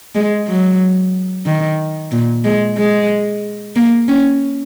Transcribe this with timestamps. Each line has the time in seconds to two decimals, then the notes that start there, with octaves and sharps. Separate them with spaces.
0.15 G#3
0.48 F#3
1.46 D#3
2.12 A#2
2.44 G#3
2.77 G#3
3.75 A#3
4.08 C#4